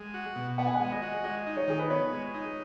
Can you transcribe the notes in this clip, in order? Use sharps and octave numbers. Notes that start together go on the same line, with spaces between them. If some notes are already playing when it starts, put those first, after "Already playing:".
Already playing: G#3
F#4
B2
B3 F#5
G#5
F#5
G#3
D#5
F#4
G#3 D#5
D#4
C#5
D#3 G#4
B4
B3 C#5
G#3
D#4